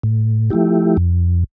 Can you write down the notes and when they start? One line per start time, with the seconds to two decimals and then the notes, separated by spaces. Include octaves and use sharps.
0.03 A2
0.50 F3 A3 E4 G4
0.97 F2